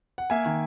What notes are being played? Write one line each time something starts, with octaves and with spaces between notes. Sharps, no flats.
F#5
A#3 E5 G#5
D#3